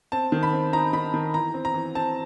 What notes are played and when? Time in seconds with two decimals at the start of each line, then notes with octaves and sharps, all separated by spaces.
0.12 C4 A5
0.32 D#3
0.43 B5
0.53 C4
0.73 D#4 A#5
0.93 D#3 B5
1.14 D#3
1.34 E3 A#5
1.54 C4
1.65 A#5
1.74 E3
1.95 C4 A5